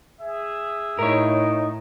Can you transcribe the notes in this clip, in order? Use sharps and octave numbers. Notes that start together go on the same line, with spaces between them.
G#4 E5
A2 D#4 A#4 C#5